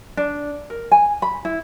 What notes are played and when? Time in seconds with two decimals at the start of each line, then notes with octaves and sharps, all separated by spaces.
0.17 D4
0.70 A#4
0.91 G#5
1.22 B5
1.45 E4